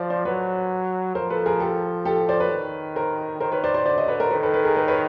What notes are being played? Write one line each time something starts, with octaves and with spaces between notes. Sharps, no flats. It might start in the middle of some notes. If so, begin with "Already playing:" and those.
Already playing: F3 C5 D5
C5 D5
F#3 B4 C#5
F3 A#4 C5
A4 B4
G#4 A#4
G4 A4
G4 A4
C5 D5
B4 C#5
D#3
A#4 C5
D#3 A#4 C5
B4 C#5
C5 D5
C5 D5
D3 C5 D5
C#5 D#5
B4 C#5
A#4 C5
D#3 A4 B4
A4 B4
A4 B4
G#4 A#4
A4 B4
B4 C#5